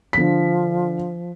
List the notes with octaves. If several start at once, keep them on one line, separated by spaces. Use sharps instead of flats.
D3 F3 B6